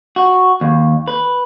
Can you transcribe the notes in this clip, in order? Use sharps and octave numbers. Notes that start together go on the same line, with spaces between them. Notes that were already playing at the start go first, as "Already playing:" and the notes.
F#4
D#2
B4